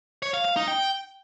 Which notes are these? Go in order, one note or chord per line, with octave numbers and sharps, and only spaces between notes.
C#5
F5
F5
D#4
G5